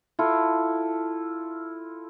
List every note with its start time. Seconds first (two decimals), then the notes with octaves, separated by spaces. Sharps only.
0.19 E4 F4 A4